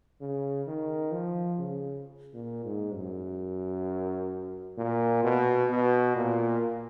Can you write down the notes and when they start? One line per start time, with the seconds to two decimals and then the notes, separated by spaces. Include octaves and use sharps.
0.21 C#3
0.67 D#3
1.12 F3
1.59 C#3
2.34 A#2
2.65 G#2
2.95 F#2
4.78 A#2
5.24 B2
5.71 B2
6.16 A#2